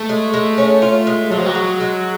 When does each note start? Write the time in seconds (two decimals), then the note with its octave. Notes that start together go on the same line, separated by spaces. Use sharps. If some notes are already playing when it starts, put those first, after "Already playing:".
Already playing: A3
0.09 G#3
0.34 G#3
0.58 C#4
0.82 F4
1.07 G#3
1.31 F#3 G#3
1.38 F3
1.46 F#3
1.55 G#3
1.80 G#3